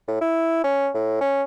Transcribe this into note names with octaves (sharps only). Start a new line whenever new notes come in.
A2
E4
C#4
A2
C#4